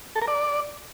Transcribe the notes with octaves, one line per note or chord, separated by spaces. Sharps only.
A4
A#4
D5